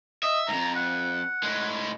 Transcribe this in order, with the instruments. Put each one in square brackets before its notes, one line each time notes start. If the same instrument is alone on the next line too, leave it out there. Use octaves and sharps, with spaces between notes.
[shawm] D#5 [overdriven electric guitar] E5
[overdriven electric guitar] F2 G#2 [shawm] A#5
[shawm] F#5
[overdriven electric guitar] A2 G#3